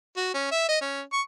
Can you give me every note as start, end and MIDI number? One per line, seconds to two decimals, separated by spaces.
0.17 0.30 66
0.34 0.51 61
0.51 0.68 76
0.69 0.79 75
0.81 1.01 61
1.13 1.21 85